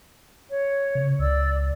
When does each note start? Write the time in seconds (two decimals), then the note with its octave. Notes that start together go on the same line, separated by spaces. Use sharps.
0.49 C#5
0.95 C#3
1.19 C#2 D5 E6